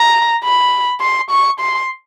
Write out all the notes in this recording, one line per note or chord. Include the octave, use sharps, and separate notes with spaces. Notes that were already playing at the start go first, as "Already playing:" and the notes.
Already playing: A#5
B5
C6
C#6
C6